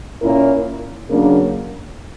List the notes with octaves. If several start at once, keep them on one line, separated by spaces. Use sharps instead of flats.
A#2 A#3 C#4 E4 A#4
C#3 F#3 A#3 D4 A#4